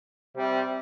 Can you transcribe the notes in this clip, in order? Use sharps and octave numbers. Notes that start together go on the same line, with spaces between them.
C3 G3